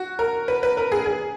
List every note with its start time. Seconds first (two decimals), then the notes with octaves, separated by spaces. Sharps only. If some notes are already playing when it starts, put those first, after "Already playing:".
Already playing: F#4
0.19 A#4
0.48 B4
0.63 B4
0.77 A#4
0.92 G#4
1.06 G#4